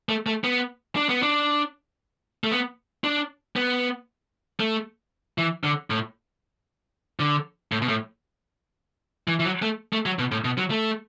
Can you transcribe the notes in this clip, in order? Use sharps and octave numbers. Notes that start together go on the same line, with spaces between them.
A3
A3
B3
D4
B3
D4
A3
B3
D4
B3
A3
E3
D3
A2
D3
A2
B2
A2
E3
E3
F#3
A3
A3
F#3
B2
A2
B2
F#3
A3